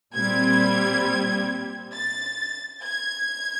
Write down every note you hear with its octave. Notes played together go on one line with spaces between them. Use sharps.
A#2 G3 C4 G#6
A6
G#6